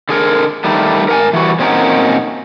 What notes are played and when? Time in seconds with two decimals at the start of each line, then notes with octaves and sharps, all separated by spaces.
0.09 D3 G#4 A#4
0.64 D#3 G3 A3
1.08 A#4 F#5 G#5
1.33 E3 G3 F#4
1.59 A#2 C4 C#4 D#4 F#4 A#4